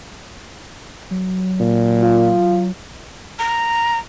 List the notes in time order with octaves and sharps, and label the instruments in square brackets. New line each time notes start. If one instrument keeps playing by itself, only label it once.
[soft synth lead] F#3
[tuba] A#2
[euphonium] F4
[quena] A#5